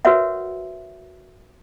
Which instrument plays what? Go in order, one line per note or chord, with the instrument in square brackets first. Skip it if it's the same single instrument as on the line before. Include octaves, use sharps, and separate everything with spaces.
[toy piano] F#4 A#4 B4 C#5 E5 F#5